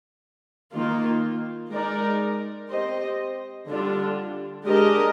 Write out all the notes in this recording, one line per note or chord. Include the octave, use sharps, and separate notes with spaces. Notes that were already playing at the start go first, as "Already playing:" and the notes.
D#3 A#3 F4
G#3 D#4 A#4 D5
C4 G4 C5 D#5
D3 G3 D4 F4
G#3 D4 G4 A#4 D#5